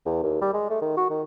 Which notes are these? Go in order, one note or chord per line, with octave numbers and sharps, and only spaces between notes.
E2
D#2
G3
G#3
A3
D#3
F#4
D#3